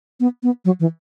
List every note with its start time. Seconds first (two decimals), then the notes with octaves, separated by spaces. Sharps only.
0.20 B3
0.43 B3
0.65 F#3
0.80 E3